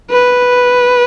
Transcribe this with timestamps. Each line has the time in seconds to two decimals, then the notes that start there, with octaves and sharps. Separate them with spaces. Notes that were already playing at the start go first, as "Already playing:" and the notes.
0.10 B4